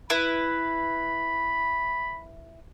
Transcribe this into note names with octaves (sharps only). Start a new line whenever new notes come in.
E4 B4 B5